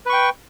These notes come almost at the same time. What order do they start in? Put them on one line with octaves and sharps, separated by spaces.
B4 C#6 G5